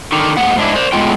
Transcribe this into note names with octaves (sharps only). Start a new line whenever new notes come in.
D3 D#3
G#2 A#3 F#5
G#2 D4 E4
C5 D5
A2 F#3 G#3 B3 F4 G5